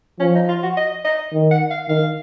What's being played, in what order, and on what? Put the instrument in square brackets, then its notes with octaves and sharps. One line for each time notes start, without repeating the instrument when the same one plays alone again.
[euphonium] F3 [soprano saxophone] C#4
[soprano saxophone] D#4
F4
F#4
D#5
D#5
[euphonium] D#3
[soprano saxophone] F#5
F5
[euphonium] D#3 [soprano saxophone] F5